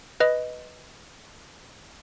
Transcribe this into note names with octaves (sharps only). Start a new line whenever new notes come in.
B4 D#5